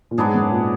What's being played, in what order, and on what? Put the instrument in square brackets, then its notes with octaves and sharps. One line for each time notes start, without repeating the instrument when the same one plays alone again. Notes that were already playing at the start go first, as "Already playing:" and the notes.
[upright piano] A#2
[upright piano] G#2 [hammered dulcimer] F#3 B3 D4 G#4
[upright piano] F#2
A#2